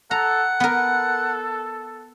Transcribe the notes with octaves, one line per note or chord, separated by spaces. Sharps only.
A4 F#5 A#5
B3 A4 A#4